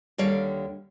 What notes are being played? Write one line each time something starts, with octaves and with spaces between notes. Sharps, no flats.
D#2 D3 G3 A#4 C#5 F5